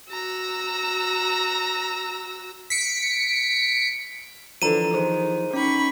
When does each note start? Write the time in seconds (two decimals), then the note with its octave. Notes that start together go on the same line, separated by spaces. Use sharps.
0.10 F#4 A#5 E6
2.70 B6 C#7 D7
4.62 D3 E3 F3 A#5 D#7
4.94 D#3 G#4 C5
5.53 C#4 D#4 B5 C#6